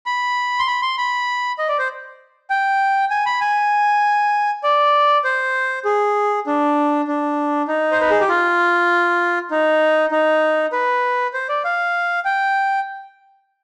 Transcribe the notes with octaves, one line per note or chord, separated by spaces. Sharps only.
B5
C6
B5
C6
B5
D#5
D5
C5
G5
G#5
B5
G#5
D5
C5
G#4
D4
D4
D#4
C5
B4
G#4
G4
F4
D#4
D#4
B4
C5
D5
F5
G5